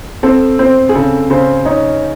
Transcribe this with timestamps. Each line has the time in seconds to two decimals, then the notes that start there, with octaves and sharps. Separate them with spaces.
0.23 C4 A4
0.59 C4 C5
0.89 G#4
0.95 C#3 A4
1.30 C#3 C5
1.65 D#4 C#5